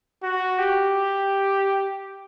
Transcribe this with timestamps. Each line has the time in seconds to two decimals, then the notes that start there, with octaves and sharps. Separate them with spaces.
0.23 F#4
0.59 G4